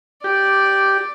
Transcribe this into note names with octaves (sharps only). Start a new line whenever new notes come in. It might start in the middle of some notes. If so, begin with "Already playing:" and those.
G4 D5